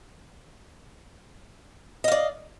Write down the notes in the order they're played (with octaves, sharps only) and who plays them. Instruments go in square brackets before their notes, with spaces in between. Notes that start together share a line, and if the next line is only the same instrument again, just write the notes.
[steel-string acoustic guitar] D#5
F5
D5